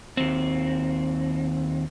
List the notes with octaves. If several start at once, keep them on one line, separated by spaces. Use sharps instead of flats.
D#2 C4